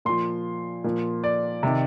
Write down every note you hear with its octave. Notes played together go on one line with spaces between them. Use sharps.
A#2 F3 C6
A#2 F3
D5
C3 D#3